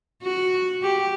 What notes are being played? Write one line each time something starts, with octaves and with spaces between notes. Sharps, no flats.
F#4
G4